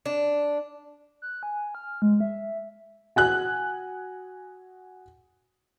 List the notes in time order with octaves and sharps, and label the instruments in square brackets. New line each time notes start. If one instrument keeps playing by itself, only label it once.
[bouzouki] D4
[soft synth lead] F#6
G#5
F6
G#3
E5
[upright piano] F#4 G#5 F#6